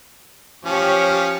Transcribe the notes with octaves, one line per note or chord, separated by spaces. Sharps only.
F3 C#4 G4 C#5